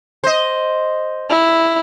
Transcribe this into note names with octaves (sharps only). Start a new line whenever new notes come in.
C5 D#5
E4